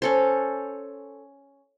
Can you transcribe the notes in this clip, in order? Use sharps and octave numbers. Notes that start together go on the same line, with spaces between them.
C#4 A4 C5